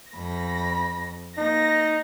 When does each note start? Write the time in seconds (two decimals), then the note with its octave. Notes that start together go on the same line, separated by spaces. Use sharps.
0.13 F2 B5 A#6
1.38 A#3 D#4 A#6